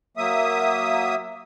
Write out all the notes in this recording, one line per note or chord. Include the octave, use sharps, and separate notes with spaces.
F#3 A#3 E5 D#6